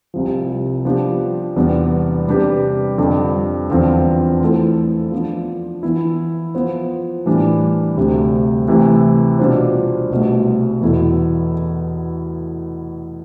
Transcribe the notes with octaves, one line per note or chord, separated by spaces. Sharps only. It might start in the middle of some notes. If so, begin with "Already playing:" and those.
C2 C3 F3
F3 B3 D4 G4
E2 C3 G3 B3 D4
C3 G3 D4 G4 B4
F2 D3 G3 D4
E2 D3 F3 C4 F4
E3 A3 E4 A4 C5
F3 B3 D4
E3 B3 E4
F3 B3 F4 C5
A2 E3 G3 D4
D2 C3 G3
C3 E3 A3 E4
B2 G3 D4 F4 C5
C2 B2 A3
E2 B2 B3 E4 A4